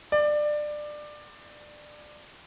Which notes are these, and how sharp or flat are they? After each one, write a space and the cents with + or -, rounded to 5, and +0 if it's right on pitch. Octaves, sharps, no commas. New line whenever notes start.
D5 +20